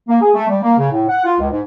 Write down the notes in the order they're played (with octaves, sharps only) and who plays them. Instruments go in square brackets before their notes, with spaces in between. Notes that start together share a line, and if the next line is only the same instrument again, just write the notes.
[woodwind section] A#3
G#4
A3
G3
A#3
C#3
A2
F#5
F4
C#2
G#2